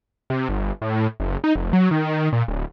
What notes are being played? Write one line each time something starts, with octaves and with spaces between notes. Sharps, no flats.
C3
G1
A2
F#1
D#4
F1
F#3
D#3
A#2
D1